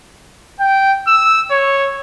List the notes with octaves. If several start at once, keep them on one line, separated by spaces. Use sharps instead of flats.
G5
E6
C#5